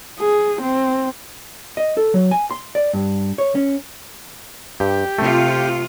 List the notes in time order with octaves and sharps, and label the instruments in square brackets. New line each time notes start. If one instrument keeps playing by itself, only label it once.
[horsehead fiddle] G#4
C4
[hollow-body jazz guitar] D#5
A4
F#3
G#5
C6
D5
G2
C#5
C#4
[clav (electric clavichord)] G2 [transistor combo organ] G4
[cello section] C3 F4 [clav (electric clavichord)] A3